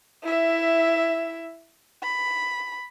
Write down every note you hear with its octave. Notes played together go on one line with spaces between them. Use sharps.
E4 E5
B5